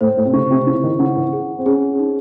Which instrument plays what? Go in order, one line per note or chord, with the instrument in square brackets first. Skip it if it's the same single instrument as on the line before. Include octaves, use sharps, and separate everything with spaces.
[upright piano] A2 [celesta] C5
[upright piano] A2
C3
[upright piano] C#3 [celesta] C#6
[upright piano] C3
[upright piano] C#3 [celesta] E4
[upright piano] D#3
[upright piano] C#3 [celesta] F#5
[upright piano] E3
[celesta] G#4
[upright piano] C4
[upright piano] C#4 [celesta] G#4
[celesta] D#4